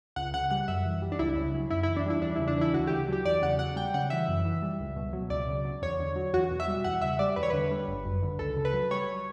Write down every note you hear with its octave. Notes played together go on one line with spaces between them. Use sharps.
C#2 F#5
C#3 F#5
G3 F#5
F#2 E5
E3
G3
D4
C#2 E4
C#3
F#3
F#2 E4
E3 E4
D4
G3 E4
E2 D4
C#3 E4
D4
E3 E4
D2 F#4
C#3 G4
F#3 G4
E2 D5
C#3 F#5
F#3 F#5
G3 G5
C#3 F#5
E3 E5
F#2
E3
G3
C#2
B2
F#3
C#2 D5
C#3
F#3
E2 C#5
D3
F#3
E2 F#4
B2
E5
G3
E2 F#5
C#3 E5
G3 D5
E2 B4
C#5
D3 B4
G3
G1
F#2
D3
C#2 A4
C#3
B4
F#3
G3 C#5